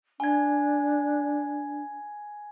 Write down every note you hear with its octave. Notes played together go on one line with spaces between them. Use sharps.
D4 G#5 G#6